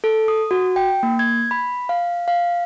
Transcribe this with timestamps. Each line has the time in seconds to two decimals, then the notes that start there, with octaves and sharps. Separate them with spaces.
0.04 A4
0.28 D#6
0.51 F#4
0.76 G5
1.03 A#3
1.19 G#6
1.51 B5
1.89 F5
2.28 F5